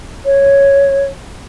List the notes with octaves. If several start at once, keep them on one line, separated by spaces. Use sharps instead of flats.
C#5